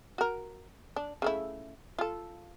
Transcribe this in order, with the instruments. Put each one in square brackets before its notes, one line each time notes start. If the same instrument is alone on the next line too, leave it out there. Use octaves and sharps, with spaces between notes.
[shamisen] F#4 A#4
D4
C#3 A3 E4
F4 A4